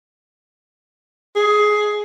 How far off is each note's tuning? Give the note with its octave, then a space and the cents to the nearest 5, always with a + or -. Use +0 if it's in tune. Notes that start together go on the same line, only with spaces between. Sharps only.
G#4 +15